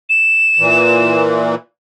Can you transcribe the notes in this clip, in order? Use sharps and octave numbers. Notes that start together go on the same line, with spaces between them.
E7
A#2 E3